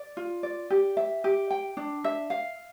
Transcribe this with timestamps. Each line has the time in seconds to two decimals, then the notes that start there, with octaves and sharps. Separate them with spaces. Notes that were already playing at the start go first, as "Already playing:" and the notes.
Already playing: D5
0.17 F4
0.43 D5
0.70 G4
0.97 E5
1.24 G4
1.50 G5
1.77 D4
2.04 E5
2.30 F5